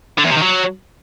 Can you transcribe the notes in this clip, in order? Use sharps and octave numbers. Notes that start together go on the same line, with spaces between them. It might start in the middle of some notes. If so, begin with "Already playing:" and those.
D3
E2
C3
D#3
F#3